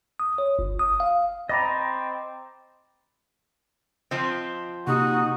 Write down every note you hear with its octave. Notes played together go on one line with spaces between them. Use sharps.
D#6
C#5
G1
D#6
F5
C4 D#5 A#5 B5 D6 A6
F3 C4 D#5
C3 A#3 D#4 F#4 G4